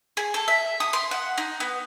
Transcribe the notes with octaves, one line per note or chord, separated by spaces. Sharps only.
G#4
A4
E5
D#6
C6
F#5
D#4
B3